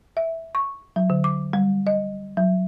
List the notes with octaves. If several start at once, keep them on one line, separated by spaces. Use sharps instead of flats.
E5
C#6
F#3
D3
D6
G3
D#5
F#3